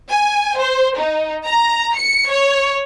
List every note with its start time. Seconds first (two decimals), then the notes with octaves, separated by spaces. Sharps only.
0.10 G#5
0.58 C5
0.97 D#4
1.45 A#5
1.95 C#7
2.30 C#5